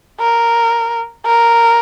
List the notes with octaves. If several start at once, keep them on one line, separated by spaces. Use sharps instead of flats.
A#4
A#4